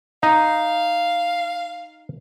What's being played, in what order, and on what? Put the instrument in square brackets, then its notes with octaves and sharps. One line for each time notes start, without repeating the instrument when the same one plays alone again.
[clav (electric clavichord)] D#4 [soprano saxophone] F5